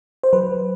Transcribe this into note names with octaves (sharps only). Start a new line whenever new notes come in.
C5
F#3 B4